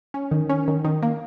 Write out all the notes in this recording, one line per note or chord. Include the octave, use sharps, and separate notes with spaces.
C#4
D#3
C#4
D#3
D#3
A#3